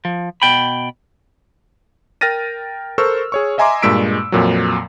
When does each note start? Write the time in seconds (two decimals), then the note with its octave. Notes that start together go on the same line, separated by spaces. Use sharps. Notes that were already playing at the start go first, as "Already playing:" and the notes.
0.05 F3
0.42 B2 G5 B5
2.21 A#4 G5 F6 A6 A#6 D#7
2.98 A4 A#4 C5 C#6 E6 F6
3.32 G#4 C#5 C#6
3.58 D#5 E5 G#5 A#5 C6 D6
3.83 G2 A#2 G#3 E6 B6 D7
4.32 F2 A#2 F#3